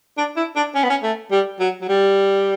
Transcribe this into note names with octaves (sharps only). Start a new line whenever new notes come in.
D4
E4
D4
C#4
B3
C#4
A3
G3
F#3
F#3
G3